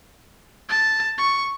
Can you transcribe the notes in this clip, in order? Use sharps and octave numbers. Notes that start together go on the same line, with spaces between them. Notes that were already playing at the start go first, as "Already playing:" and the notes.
A5
C#6